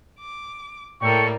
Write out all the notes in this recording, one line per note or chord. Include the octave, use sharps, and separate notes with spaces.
D6
A2 G3 A#3 A4 G5 C#6